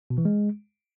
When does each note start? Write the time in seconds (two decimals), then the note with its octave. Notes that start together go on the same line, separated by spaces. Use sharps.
0.10 B2
0.18 E3
0.25 G#3